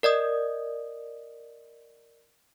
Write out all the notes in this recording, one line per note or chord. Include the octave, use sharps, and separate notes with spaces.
A#4 D5 D#5 D#6